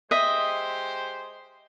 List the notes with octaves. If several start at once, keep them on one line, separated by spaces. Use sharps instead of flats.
G#3 G4 C5 D#5 E5